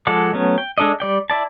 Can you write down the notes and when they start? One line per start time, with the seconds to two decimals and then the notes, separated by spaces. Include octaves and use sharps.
0.07 F3 G#3 A4 F#5 D6
0.34 F#3 A3 B3 C#4
0.58 G5
0.78 G#3 D4 A4 D5 D#5
1.00 G3 D5 G5
1.30 E4 D5 A5